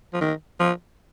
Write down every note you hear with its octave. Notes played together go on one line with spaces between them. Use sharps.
F3
D#3
F3